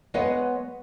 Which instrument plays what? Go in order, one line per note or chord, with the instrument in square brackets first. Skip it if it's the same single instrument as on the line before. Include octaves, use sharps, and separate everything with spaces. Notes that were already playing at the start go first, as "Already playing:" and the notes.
[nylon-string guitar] G#3 B3 B4 C#5 D#5 F#5